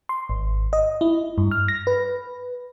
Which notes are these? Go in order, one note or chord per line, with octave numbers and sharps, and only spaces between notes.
C6
G#1
D#5
E4
G2
F6
A#6
B4